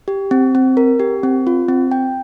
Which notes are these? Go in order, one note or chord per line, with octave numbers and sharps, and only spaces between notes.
G4
C4
C4
A#4
G4
C4
F4
C4
G5